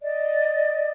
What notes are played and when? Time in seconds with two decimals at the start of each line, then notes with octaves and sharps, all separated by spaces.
0.01 D5 D#5